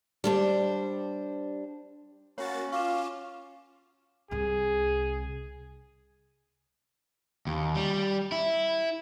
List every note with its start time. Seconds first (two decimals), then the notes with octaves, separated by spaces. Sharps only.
0.24 G3 D4 C5
2.38 A#3 C#4 F#4 C#5 A6
2.72 F4 F5 C#6 D6 E7
4.31 C2 C3 G#4
7.47 D#2
7.75 G3
8.32 E4